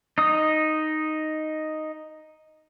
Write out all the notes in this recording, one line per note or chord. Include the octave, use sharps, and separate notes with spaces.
D#4 D#6